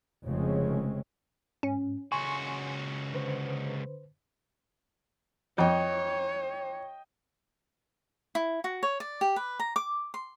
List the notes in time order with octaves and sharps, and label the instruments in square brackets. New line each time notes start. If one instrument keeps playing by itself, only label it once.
[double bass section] F1 C#3 F3 G#3 C4 C#4
[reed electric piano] G#2 [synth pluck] C#4
[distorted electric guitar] C#2 F#4 [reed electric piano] G#5 C6 C#6
[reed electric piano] D3 B4 C5
[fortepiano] F2 [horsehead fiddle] C#5 [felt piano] D#5 G5
[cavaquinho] E4
F#4
C#5
D5
G4
B4
A#5
D6
C6